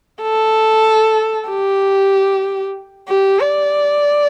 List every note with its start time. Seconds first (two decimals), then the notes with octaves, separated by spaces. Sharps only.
0.23 A4
1.50 G4
3.09 G4
3.40 D5